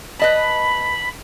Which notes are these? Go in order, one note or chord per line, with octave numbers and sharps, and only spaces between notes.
B4 D#5 A5 B5